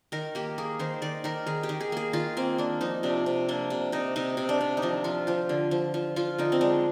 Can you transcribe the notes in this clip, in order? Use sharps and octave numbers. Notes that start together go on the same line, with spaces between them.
D#3 A#4
A#3 G4
A#3 G#4
D#3 C5
D#3 D5
D#3 A#4
D#3 G#4
G4
D#3
G#4
A#3 G#4
D#3 F4
A#3 C4
A#3 D4
F3 D#4
C3 D4
C3
A#3 D4
C3
C3 D#4
C3 D#4
C3
D4
C3
D#4
F3 D4
F3 F4
F3 G4
D3
F3
F3
F3 F4
D3 D#4
C4
G#3 D4